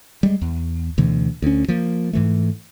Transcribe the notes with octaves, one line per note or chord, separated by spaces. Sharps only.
G3 G#3
E2
D2 B2 E3
D2 C#4
F3 A#3
G#2 E3 A3